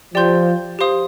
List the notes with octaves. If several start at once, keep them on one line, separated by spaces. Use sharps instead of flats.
F3 G4 D5 G5 C6 G6
G4 C5 F5 C6 D#6